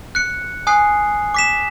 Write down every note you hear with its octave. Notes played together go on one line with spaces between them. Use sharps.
F#6 C#7
G#5 D#6 F#6 C7
D6 B6 E7